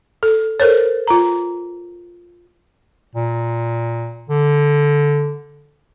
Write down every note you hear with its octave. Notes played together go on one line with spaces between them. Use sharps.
A4
A4 A#4 C5 C#5
F4 A#5
A#2
D3